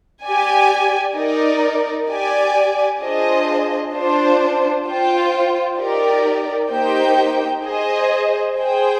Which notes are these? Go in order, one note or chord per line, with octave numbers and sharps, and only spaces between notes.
G4 D5 G#5
D#4 A#4 D5
G4 D5 G#5
D4 F4 G#4 C5 D#5
D4 F4 C5
F4 C5 G5
D#4 G4 A#4 D5
A#3 D#4 G4 C5 G5
G#4 C5 D#5
G#4 C5 G5